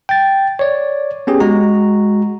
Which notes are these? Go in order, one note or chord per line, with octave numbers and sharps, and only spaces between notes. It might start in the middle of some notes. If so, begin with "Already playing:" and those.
G5 A6
C#5 D5
B3 C#4 G4 G#4
G#3 F#4 A#5